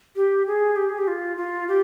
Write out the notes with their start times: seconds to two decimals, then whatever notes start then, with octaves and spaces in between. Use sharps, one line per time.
0.16 G4
0.47 G#4
0.76 G4
0.89 G#4
0.98 G4
1.08 F4
1.37 F4
1.68 G4